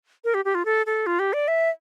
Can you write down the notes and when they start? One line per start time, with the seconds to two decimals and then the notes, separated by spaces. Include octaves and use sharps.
0.25 A#4
0.34 G4
0.45 G4
0.55 F4
0.65 A4
0.86 A4
1.07 F4
1.19 G4
1.33 D5
1.48 E5